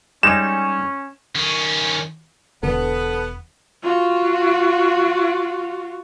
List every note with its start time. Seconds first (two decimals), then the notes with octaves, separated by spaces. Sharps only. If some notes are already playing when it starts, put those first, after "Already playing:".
0.23 G3 G#3 C#4 D#4 E7
1.35 D#3 C#4
2.63 E1 D3 E3 B3 A4
3.83 F4 F#4